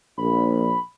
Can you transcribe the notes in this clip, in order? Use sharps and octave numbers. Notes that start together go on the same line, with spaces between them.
A#1 B5